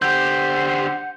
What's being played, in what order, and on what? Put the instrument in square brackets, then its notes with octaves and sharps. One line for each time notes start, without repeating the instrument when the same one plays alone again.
[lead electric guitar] D3 G4 [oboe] C5 [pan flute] F#5 [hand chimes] G6